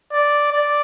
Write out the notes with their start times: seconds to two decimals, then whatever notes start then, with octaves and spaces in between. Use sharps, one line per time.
0.12 D5
0.52 D5